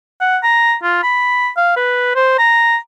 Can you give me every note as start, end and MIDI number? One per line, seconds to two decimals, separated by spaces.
0.21 0.38 78
0.43 0.74 82
0.83 0.99 65
1.03 1.49 83
1.57 1.75 77
1.77 2.11 71
2.16 2.37 72
2.39 2.76 82